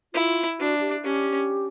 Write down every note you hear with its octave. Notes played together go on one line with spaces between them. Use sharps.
E4 F4
D4 F#4
G4
C#4 G4